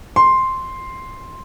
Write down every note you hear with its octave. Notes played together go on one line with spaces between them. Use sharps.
C6